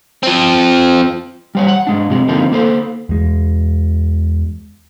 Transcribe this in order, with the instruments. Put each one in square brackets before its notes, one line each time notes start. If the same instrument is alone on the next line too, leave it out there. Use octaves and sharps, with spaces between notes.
[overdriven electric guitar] F3 C4
[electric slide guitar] G3 C5 C#5
F#5
G#2 G#3 D4
F2 C3 F3 G#3
D3 D#3 F3 A#3 C4
A#3 A4 B4 C5
[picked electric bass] E2 G#3